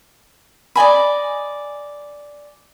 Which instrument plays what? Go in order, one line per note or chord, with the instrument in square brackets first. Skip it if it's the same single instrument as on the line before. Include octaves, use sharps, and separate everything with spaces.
[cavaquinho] D5 D#5 G#5 B5